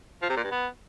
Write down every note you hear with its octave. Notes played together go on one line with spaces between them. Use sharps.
F3
C3
A#2
G2
B3